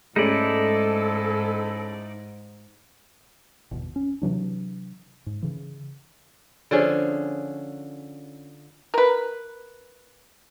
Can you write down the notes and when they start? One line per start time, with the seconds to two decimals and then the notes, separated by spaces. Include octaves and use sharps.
0.16 G#2 G#3 A3 C#4 D#4 E4 A4 D5
3.71 G1 E2 B2
3.96 C#4
4.22 C3 E3 F#3 D4
5.26 G#2
5.42 C#3 E3
6.71 D3 F3 C#4 G#4
8.94 A#4 B4